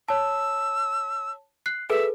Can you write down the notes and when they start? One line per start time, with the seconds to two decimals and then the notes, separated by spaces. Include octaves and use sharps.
0.09 C#5 A5 E6
1.66 F#6 C7
1.90 G#4 A4 B4 E5